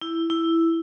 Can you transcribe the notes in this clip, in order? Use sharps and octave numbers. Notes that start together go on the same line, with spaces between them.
E4
E4